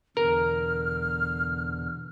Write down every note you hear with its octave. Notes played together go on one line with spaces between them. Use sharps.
E2 B2 D3 A#4 F6